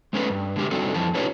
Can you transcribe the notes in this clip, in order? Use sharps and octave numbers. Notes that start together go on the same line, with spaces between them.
G#3 A3 C#4 A#4 B4
G2
D3 G#3 G4 A#4
G3 C4 D4 D#4 F#4 A4
F2 E3 A5
C#4 D#4 F4 G4 B4 C#5